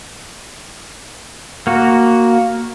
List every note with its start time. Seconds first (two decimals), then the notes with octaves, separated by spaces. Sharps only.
1.67 A#3 F#4